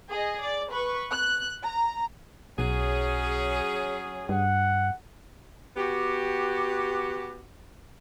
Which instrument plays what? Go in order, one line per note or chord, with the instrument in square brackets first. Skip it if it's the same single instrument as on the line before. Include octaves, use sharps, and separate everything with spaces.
[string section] G#4 D#5
D5
B4 C#6
F#6
A#5
[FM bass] B1 [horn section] F#3 C#4 G#4
[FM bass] G2 [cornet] F#5
[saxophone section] B3 F#4 G4